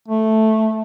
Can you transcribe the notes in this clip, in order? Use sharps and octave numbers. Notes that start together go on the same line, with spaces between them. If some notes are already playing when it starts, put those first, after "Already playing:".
A3